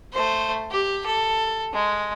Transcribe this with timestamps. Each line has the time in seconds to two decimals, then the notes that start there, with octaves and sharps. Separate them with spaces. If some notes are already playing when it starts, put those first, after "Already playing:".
0.13 A3 C5
0.71 G4
1.06 A4
1.73 G#3